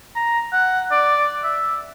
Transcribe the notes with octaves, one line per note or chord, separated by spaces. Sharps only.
A#5
F#5
D5
E5